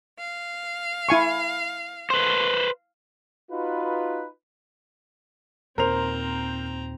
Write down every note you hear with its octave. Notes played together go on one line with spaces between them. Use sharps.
F5
E4 G#5 C#6
B4 C5
D#4 F4 F#4 B4
D#2 A#2 C4 A#4 C5 A#5 F7